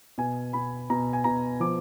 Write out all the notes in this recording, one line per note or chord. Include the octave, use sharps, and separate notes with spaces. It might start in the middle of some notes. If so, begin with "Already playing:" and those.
B2 G#5
B2 B5
B2 A#5
G#5
B2 A#5
F3 D6